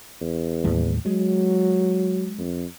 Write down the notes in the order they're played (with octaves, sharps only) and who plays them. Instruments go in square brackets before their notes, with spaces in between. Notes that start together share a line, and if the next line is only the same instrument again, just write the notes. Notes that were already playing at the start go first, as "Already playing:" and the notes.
[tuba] E2
[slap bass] D#2 A2 G3
[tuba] F#3 [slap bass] G#3
[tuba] F2